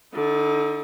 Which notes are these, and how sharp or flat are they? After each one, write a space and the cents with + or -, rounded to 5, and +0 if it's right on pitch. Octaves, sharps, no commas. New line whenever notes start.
D3 +0 D#4 +35